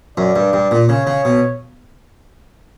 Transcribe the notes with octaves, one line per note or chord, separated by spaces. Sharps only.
F#2 D5
G2
G2
A#2
C#3 C#5
C#3
B2